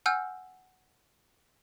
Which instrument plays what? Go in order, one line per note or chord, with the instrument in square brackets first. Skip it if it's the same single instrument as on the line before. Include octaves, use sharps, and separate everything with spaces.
[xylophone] F#5 G#5 E6 F6 G6